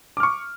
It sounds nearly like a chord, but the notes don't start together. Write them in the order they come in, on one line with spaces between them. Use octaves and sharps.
D6 F6 C#6